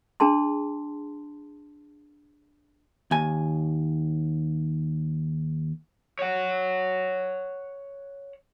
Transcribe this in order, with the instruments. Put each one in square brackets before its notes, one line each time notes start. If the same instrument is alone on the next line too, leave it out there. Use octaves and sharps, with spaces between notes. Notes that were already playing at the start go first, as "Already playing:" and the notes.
[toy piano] D4 G#4 A5 C6
[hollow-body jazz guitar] D#2 G#5
[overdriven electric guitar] C#5 F#5